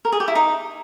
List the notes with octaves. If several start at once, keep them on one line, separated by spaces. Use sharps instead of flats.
A#4
G#4
G4
E4
D#4